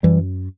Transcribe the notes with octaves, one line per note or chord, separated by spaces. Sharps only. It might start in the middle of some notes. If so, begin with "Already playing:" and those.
F#2 E3 G3